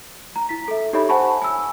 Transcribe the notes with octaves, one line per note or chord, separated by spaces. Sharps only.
A#5
E4 B6
A4 E5
D#4 G4 A4 C#5 E5 B5
C5 F#5 G#5 A5 B5 C#6
G#5 E6